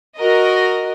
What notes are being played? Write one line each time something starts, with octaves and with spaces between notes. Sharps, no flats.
F#4 A#4 D#5